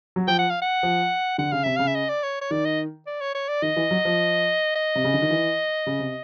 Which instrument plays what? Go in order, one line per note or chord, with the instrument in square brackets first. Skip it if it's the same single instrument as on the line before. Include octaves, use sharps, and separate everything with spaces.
[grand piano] F#3
[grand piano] F3 [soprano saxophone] G5
[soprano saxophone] F#5
F5
F#5
[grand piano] F3
[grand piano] D3 [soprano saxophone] F#5
[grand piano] C#3 [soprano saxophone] F5
[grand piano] C3 [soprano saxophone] E5
[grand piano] C#3 [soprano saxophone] F5
[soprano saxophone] E5
D#5
D5
C#5
C#5
[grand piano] D#3 [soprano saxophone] D5
[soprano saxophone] D#5
D5
C#5
C#5
D5
[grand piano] D#3 [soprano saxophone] D#5
[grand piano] E3
F#3
F3
[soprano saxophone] D#5
[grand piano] C3
C#3
D3
D#3
E3
C#3
C3